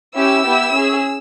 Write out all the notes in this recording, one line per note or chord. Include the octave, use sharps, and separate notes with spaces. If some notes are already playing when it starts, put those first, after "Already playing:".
C#4 E4 G4 E6
B3 E4 G4
C#4 G#4